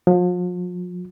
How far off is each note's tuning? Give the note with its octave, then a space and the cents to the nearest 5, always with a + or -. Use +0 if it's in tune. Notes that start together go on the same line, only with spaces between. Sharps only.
F3 +40